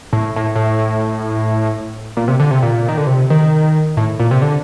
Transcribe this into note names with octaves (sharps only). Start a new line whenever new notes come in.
A2
A2
A2
A#2
C3
D3
C3
A#2
D#3
D3
C3
D#3
A2
A#2
C3
D3